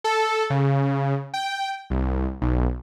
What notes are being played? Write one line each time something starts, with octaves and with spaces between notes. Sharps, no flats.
A4
C#3
G5
C2
B1